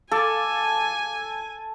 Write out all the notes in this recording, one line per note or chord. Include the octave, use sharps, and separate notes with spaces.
A4 F5 G#5 D6 A6